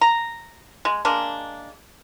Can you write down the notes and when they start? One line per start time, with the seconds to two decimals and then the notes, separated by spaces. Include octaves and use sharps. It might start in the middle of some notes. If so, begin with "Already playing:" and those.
0.01 A#5
0.85 G#3
1.05 G#3 A#3 D4